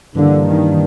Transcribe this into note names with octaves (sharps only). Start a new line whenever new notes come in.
G2 D3 E3 G3 A#3 D4
D#3